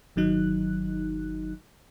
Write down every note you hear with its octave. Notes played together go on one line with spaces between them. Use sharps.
G1 D#3 F#3 D#4 F#6